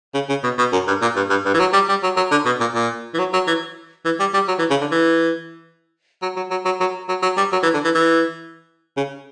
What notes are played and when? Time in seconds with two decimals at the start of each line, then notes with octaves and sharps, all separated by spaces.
0.14 C#3
0.29 C#3
0.44 B2
0.58 B2
0.73 F#2
0.88 G2
1.02 A#2
1.16 G2
1.30 G2
1.45 G2
1.54 E3
1.60 F#3
1.73 G3
1.89 G3
2.03 F#3
2.17 F#3
2.31 D3
2.46 B2
2.61 A#2
2.75 A#2
3.14 E3
3.19 F#3
3.34 F#3
3.47 E3
4.05 E3
4.20 G3
4.34 G3
4.48 F#3
4.59 E3
4.70 C#3
4.81 D3
4.92 E3
6.22 F#3
6.37 F#3
6.51 F#3
6.65 F#3
6.80 F#3
7.09 F#3
7.23 F#3
7.37 G3
7.53 F#3
7.63 E3
7.74 D3
7.85 E3
7.95 E3
8.97 C#3